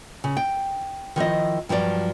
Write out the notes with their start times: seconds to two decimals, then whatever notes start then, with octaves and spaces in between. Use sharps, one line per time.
0.24 C#3
0.37 G5
1.16 D#3 F3 E4 D#5
1.69 G2 F3 F#3 D5